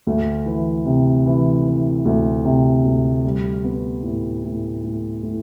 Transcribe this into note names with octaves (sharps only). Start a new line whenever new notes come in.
D2
E3
C3
E3
E3
D2
C3
D2
G3
B3
A2
A2
A2
A2